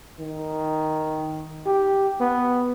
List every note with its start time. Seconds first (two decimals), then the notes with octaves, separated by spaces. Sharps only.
0.19 D#3
1.66 G4
2.20 B3